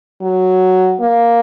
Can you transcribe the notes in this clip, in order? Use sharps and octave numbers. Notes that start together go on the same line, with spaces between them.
F#3
A#3